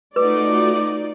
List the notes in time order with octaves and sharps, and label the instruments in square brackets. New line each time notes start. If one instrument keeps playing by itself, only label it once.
[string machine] A3 F#4 [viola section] D#4 F4 D5 [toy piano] B4 [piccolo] D6